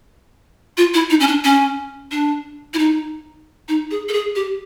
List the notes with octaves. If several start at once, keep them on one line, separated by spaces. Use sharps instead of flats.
F4
E4
D#4
C#4
D4
C#4
D4
E4
D#4
D#4
G#4
A4
G#4
G4